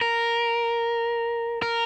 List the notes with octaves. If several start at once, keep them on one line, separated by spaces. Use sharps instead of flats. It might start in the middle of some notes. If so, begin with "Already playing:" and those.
A#4
A#4